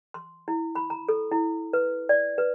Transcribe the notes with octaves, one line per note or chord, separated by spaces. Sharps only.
C6
E4
B5
A#5
A4
E4
B4
D5
B4